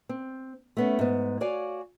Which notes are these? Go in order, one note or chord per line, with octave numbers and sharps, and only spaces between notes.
C4
A3 B3 C#4
G#2 B3
F#4 C#5 D5 F5 G#5